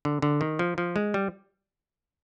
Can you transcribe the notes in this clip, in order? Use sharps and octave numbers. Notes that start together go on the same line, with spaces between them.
D3
D3
D#3
F3
F3
G#3
G3